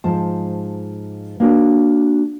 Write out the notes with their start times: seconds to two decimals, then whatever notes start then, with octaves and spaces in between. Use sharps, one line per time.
0.04 G#2 F3 C5 A5
1.40 A#3 D4 F#4 C#5